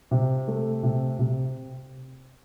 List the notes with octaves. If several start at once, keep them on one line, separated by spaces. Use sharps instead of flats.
C3
A3
C3
C3